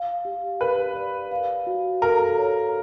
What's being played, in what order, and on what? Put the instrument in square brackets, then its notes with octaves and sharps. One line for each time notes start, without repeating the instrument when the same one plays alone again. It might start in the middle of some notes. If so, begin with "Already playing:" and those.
Already playing: [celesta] F5
G4
[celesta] A#4 [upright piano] B4
[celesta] D5
F5
F#4
[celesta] A4 [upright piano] A#4
[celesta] C#5